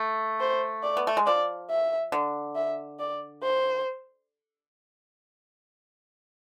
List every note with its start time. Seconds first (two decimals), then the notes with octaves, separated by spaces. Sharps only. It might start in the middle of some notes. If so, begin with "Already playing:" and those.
Already playing: A3
0.40 C5
0.83 D5
0.97 B3
1.07 A3
1.17 G#3
1.26 F3 D5
1.70 E5
2.12 D3
2.56 E5
2.99 D5
3.42 C5